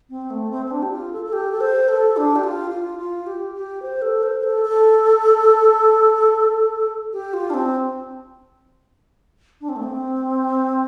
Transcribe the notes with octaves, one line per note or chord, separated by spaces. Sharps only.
C4
A3
C4
C4
D4
G4
F4
A4
A4
G4
A4
C5
A4
D4
G4
F4
F4
F4
G4
G4
C5
A4
C5
C5
A4
A4
G4
F4
D4
C4
D4
C4
A3
C4